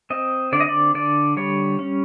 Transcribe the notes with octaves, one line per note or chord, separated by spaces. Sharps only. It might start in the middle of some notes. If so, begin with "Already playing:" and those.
C4 D#5
D3 D5
D#5
D5
D3 D5
G3 C#5
C#4